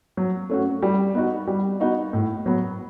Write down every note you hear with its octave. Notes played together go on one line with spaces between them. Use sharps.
F#3
A3 C#4 F#4
G3
B3 D#4 F#4
G3
B3 D#4 F#4
A2
F#3 B3